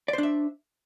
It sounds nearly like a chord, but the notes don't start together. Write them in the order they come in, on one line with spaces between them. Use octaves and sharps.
D5 C5 D4 E5